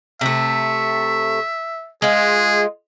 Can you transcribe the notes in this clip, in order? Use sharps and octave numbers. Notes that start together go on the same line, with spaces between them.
C3 A3 E5
G#3 F4 G#4